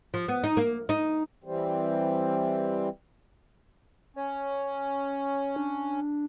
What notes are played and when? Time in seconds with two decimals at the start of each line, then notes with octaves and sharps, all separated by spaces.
0.14 F3
0.28 B3
0.44 D#4
0.57 A#3
0.89 D#4
1.44 E3 G3 C4
4.16 C#4 C#5
5.56 D4